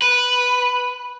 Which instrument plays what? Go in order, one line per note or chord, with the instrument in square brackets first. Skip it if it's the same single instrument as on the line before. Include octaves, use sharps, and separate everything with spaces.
[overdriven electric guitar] B4